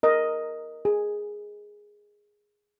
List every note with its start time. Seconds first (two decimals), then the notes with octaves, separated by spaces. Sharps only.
0.03 A#4 D#5
0.85 G#4